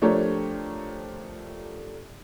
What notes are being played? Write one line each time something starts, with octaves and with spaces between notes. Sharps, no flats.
F3 A3 D4 G4 A#4 C#5